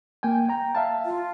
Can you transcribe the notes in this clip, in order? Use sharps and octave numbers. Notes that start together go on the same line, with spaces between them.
A#3 G5 G#5
G5 A#5
E5 F5 A5
F4